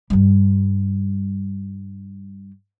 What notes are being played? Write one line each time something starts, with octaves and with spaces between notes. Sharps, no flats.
G2 G3